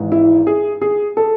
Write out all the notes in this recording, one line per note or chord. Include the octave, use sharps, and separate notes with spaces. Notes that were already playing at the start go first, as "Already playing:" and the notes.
Already playing: G#1 G#2 E3
E4
G#4
G#4
A4